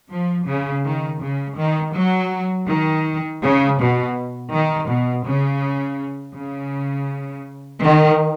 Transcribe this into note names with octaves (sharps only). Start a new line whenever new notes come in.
F3
C#3
D#3
C#3
D#3
F#3
D#3
C#3
B2
D#3
B2
C#3
C#3
D#3